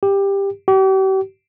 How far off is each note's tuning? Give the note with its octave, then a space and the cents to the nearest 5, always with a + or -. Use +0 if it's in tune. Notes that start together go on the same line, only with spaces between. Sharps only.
G4 +15
G4 -40